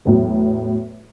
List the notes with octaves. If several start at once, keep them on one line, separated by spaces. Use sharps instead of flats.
E2 A2 F#3